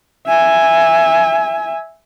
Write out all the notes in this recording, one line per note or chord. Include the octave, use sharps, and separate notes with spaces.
E5 G#5